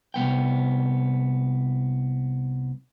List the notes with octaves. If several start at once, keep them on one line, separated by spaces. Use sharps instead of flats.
C2 F3 B3 G5